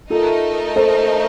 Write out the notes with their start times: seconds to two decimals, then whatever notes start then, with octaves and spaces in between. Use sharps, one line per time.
0.10 A3 D#4 F4 A4 A#4 D#5
0.76 A4 C5